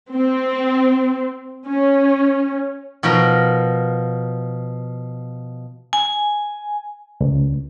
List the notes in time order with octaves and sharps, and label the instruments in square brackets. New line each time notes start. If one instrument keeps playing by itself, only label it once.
[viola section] C4
C#4
[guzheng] B2 F3 A#4 A#5
[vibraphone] G#5
[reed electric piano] C#2